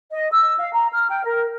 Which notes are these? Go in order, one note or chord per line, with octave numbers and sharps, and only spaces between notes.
D#5
E6
F5
A#5
F6
G5
A#4